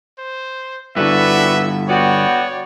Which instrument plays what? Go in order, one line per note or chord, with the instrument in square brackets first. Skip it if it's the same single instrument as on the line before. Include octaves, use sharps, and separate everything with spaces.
[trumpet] C5
[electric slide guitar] G2 D3 [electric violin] E4 A4 [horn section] F#4 B4 D5 [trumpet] E5
[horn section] B3 F#4 G5 [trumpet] C#5 [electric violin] D5